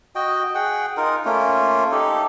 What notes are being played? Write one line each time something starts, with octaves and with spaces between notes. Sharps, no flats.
F#4 D#5 G5
G#4 F#5 G5
D#4 F4 A#4
A3 A#3 C#4 F4
D#4 G4 A4